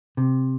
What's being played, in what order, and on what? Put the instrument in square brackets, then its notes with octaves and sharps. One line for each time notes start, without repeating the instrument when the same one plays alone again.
[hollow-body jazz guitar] C3